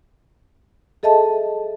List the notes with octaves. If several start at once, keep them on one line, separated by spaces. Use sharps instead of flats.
G#4 A4 D#5 E5 A5